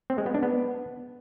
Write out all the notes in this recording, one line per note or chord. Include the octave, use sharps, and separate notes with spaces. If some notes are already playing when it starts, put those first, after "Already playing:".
C4
G#3
B3
D4
B3